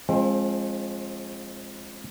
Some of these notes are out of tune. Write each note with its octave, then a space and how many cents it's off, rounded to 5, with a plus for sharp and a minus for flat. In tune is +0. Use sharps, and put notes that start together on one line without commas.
F3 +0 G#3 -5 C4 +40